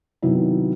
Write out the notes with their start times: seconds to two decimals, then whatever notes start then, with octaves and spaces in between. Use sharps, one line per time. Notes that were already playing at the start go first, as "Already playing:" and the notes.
0.22 C3 D#3 F#3 B3 E4